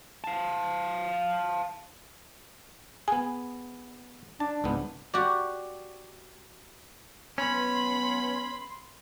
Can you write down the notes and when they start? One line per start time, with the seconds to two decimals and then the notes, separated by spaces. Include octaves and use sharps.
0.24 F5 A5
3.08 B3 G#4 G#5
4.40 D4 A5
4.64 C#2 G#2 B3
5.14 F#4 G4 D5
7.38 F#3 B3 C#4 B4 B5 C6